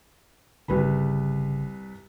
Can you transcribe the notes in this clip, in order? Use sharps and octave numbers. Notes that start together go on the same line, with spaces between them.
G1 C2 C#3 B4 B5